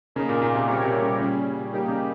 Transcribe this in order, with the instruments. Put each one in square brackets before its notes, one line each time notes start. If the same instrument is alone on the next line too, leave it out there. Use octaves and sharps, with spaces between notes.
[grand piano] C#3 [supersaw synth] A#3 D#4 A#4
[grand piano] A#2
A#2
C3
[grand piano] A#2 [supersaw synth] G3 C4 G4 A#4 C#5
[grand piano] C3
C#3
[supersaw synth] A#2 G3 C#4 [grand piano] C#3
[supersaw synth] G3 A#3 D#4 G4
[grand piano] C#3